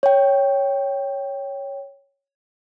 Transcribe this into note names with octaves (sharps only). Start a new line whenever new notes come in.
C#5 G5